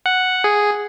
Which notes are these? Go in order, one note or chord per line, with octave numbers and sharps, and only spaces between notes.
F#5
G#4